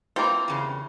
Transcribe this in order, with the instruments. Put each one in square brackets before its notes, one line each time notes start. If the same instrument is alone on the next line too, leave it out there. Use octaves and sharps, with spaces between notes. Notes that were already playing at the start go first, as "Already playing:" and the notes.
[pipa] E3 G3 C4 [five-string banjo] A#3 F4
[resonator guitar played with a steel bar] E2 C#3